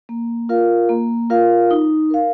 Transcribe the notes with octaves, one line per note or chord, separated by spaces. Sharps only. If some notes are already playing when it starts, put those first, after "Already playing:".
A#3
F4 A#4 F5
A#3
F4 A#4 F5
D#4
A#4 F5